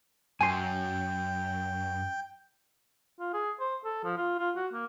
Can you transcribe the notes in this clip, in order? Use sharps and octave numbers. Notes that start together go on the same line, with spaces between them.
F#2 G5 G#5 C6
F4
G#4
C5
A4
F3
F4
F4
F#4
A#3